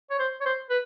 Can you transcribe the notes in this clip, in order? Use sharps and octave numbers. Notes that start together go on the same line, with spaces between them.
C#5
C5
C#5
C5
B4